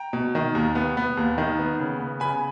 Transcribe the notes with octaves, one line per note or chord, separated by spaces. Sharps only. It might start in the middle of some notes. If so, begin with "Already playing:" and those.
Already playing: G5 A#5
B2
D#3
D#2
B3
B3
D#2
D#3
B3
C#3
B3
C#3 G#5 B5